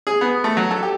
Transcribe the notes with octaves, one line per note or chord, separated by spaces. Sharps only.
G#4
B3
A3
F#3
A4
G4